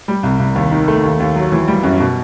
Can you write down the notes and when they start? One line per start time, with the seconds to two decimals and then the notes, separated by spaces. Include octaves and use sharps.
0.08 G3
0.23 C2
0.40 C2
0.56 D#2
0.71 D#3
0.88 A3
1.03 D#2
1.20 D#2
1.36 F#3
1.52 E3
1.68 G3
1.83 F#2
2.00 B2